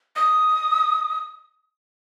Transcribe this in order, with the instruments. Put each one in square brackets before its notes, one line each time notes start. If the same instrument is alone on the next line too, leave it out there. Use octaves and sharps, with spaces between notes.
[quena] D#6